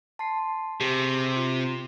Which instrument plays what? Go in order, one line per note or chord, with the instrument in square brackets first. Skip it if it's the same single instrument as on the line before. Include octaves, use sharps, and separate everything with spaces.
[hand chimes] A5 C6 C7
[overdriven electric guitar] C3 [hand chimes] G4 G#4
[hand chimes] F4